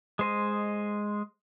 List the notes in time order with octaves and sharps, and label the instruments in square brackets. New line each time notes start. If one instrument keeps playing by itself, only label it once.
[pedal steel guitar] G#3 C5 D#5